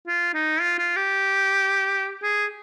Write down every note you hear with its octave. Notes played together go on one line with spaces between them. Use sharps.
F4
D#4
F4
F4
G4
G#4